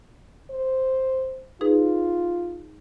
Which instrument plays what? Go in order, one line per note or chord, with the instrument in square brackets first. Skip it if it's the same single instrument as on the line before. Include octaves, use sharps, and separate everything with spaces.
[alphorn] C5
[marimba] D#4 G#4 B4 [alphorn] F4